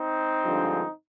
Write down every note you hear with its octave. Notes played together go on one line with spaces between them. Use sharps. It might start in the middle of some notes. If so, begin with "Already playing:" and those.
Already playing: C4 D#4
G2 D3 F3 G#3